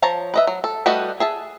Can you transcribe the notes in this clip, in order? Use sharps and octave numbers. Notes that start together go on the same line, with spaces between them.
F3 C#5 A5 A#5
B4 D#5 E5
F#3
A4
G3 A3 F#4 B4 D#5
G#4 E5 A5